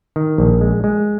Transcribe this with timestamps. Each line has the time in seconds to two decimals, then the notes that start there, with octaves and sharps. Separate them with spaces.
0.16 D#3
0.38 A#1
0.61 G#3
0.84 G#3